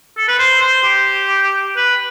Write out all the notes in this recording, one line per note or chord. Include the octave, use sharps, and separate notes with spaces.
A4
B4
C5
C5
G4
B4